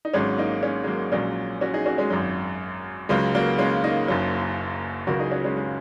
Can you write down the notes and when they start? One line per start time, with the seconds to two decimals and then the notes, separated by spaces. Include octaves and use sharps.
0.05 D#4
0.13 G#1 G#2 F#3 G#3 C#4
0.38 A#3 D#4
0.62 G#3 C#4
0.84 G#3
0.87 F#3 A#3
1.12 A#1 A#2 F#3 G#3 C#4
1.61 C#4 F#4
1.74 D#4 G#4
1.86 C#4 F#4
1.98 G#3 C#4
2.10 G#1 F#2 F#3
3.09 C#2 C#3 F#3 G#3
3.35 F#3 A#3
3.58 G#3 C#4
3.84 A#3 D#4
4.08 F#1 F#2 F#3
5.07 C#2 C#3 F#3 F#4 A#4
5.19 D#4 G#4
5.31 C#4 F#4
5.44 G#3 C#4
5.57 G#3